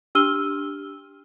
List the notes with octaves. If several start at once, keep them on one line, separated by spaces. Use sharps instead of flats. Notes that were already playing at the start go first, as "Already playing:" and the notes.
D4 G4 E6 F6 D#7 G7